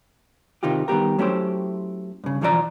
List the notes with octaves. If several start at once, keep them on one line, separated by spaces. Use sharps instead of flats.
C3 D#3 D#4 F4 G4
D#3 G3 B3 G4 A#4
F#3 A3 C#4 E4 G4 C5
G2 C#3
B1 E3 F3 A4 D5 A#5